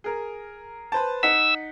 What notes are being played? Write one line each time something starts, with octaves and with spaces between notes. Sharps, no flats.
G#4 A#4
B4 C5 A5
D#4 F#5 E6 B6